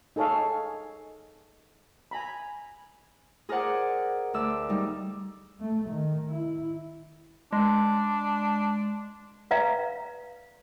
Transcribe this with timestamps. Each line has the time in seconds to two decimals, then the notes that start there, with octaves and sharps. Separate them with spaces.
0.16 D#4 G#4 A4 C#5 F5
2.11 G#5 A#5 B5
3.49 G#4 A#4 C5 D5 F#5 G#5
4.34 D2 D5 E6
4.69 G3 D#4
5.60 A3
5.89 D#3
6.29 E4
7.53 G#3 D4
9.51 B4 D5 E5 F5 A#5